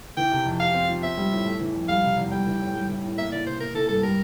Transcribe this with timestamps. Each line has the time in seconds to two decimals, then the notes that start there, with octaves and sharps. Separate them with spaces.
0.17 E3 G5
0.32 C3
0.46 F2
0.59 G4 F5
0.74 C4
0.89 F3
1.03 C4 E5
1.17 G3
1.32 A2
1.46 A3
1.60 E3
1.75 F2
1.89 G3 F5
2.03 C3
2.17 E2
2.31 G3 G5
2.47 E3
2.61 A2
2.75 G3
2.89 E3
3.04 A2
3.18 A#3 E5
3.32 E3 D5
3.46 C3 C5
3.60 A#3 A#4
3.74 E3 A4
3.88 G2 A4
4.03 G3 A#4